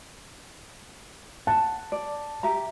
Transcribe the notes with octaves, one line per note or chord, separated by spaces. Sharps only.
F#5 A5
D5
G4 E5 A#5